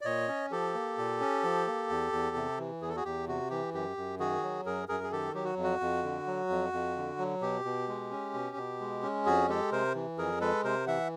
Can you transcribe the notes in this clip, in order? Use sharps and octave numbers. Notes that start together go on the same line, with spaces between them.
D5
A#2 C#5 D#5
C#4
F3 G4 A4
A#3
A#2
C#4
F3
A#3
E2
E2
C3
E3
E2 G#4
A4
F#4 G#4
E2 G4
C3 F#4
E3 G4
F#2 G4
F#2
D#3 F#4 G#4
F#3
F#2 G#4 A#4
F#2 G#4 A#4
G#4
D#3 G4 A4
F#3 G4
F#4
F2
F#4
F2
D3
F#3
F2
F2
D3
F#3
B2 G4
B2
G#3
C#4
B2
B2
G#3
C#4
F2 F#4 G#4
G#3 G4 A4
C3 A#4 C5
E3
F2 G#4 A#4
G#3 A4 B4
C3 A#4 C5
E3 E5 F#5